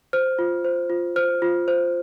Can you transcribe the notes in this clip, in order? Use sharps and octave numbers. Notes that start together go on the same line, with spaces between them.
C5 F6
F4
C5
F4
C5 F6
F4
C5